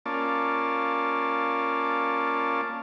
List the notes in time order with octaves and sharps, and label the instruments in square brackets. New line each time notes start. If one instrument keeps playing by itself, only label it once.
[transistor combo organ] A#3 C#4 F4 D5 A5